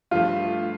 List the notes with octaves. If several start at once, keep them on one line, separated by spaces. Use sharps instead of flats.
G2 F3 A3 F4